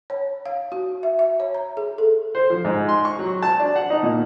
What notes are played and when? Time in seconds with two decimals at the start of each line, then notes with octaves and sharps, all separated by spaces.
0.10 C#5
0.46 F5
0.72 F#4
1.03 E5
1.19 E5
1.40 C#5
1.55 A#5
1.77 G#4
1.98 A4
2.35 C5
2.50 F3
2.65 G#2
2.89 C6
3.05 C#6
3.19 F#3
3.43 A5
3.59 D4
3.76 F#5
3.90 D#4
4.03 A#2